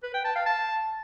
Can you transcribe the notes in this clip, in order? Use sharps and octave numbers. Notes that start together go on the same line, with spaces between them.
B4
G5
A5
F5
A5